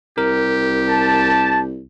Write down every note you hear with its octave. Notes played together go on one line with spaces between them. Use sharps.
C2 G4 A#4
A5